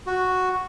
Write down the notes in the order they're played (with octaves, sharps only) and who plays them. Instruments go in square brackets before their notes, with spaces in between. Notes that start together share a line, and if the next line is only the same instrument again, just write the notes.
[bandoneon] F#4